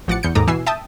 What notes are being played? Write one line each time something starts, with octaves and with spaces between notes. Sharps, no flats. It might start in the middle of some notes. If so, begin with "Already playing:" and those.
A1 F3 F#5 D6 A6 C#7
E2 G6 C#7
D#2 G#2 A4 A#5 D6 D#6
B2 E3 G#5 E6 C7
E5 G5 A5 D#6